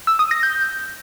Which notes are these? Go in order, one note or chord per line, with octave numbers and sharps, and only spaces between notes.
E6
D#6
A#6
G6